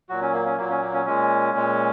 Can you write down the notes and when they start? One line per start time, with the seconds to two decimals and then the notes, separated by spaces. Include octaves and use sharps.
0.09 A#2 F#3 F#4
0.22 C#4
0.33 A#3
0.46 C#4
0.58 A#2 F#3 A#3
0.70 C#4
0.82 A#3
0.93 C#4
1.06 A#2 G#3 C#4
1.54 A#2 G#3